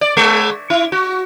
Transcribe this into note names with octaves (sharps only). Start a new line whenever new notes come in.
D5
G#3
E4
F#4